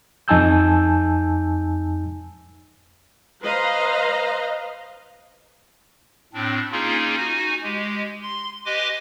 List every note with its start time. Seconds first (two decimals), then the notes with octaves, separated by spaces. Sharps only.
0.28 F2 D#4 G#5 A5 E6 G6
3.43 B4 C5 D#5 F5 A#5
6.33 A2 C4 D4
6.72 A#3 C#4 D#4 F4 G#4
7.17 D#4 F#4 G#5
7.63 G#3 G4
8.22 C6
8.66 G4 B4 D#5 G#5 C6 D6